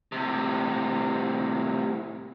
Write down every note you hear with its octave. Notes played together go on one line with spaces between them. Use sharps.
A2 C3